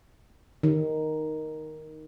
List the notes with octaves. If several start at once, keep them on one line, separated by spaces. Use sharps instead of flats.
D#3